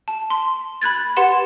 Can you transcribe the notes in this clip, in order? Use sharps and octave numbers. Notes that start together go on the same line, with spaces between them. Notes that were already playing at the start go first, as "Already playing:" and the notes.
A5
C6
B5 F#6 G#6 A6
G4 B4 F#5 C6 E7